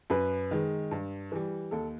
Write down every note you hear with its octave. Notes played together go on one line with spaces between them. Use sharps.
F#2 B4
D#3 G#3
G2
E3 G3
D#2 A4